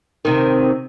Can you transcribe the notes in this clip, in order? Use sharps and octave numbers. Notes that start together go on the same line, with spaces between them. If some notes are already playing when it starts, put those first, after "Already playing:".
C3 D#3